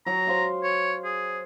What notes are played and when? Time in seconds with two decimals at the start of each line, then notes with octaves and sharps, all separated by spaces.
0.07 F#3 A#5
0.27 C5 F5
0.64 C#5
1.05 G#4